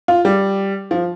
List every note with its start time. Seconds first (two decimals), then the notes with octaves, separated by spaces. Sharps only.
0.08 F4
0.25 G3
0.91 F3